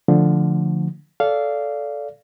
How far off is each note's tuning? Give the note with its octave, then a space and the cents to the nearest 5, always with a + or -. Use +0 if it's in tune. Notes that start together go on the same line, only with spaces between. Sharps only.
D3 +0 F3 +0 A3 +0
A4 -10 D5 -20 F5 -10